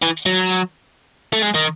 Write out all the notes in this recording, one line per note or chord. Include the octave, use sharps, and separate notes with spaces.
E3
F#3
A3
G#3
D#3